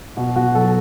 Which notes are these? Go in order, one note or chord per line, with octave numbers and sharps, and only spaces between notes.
B2 F#4
B2 F#4
F#3 A4